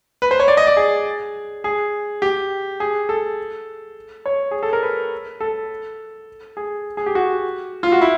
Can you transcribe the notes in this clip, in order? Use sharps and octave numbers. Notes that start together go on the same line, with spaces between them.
B4
C5
C#5
D5
D#5
D5
G#4
G#4
G4
G#4
A4
C#5
G#4
A4
A#4
B4
A4
G#4
G#4
G4
F#4
F4
F#4
E4